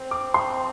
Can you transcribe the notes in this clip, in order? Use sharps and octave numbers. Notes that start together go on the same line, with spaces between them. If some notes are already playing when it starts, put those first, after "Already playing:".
Already playing: C4
D6
C6